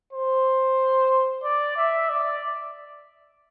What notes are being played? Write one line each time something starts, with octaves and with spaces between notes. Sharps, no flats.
C5
D5
E5
D5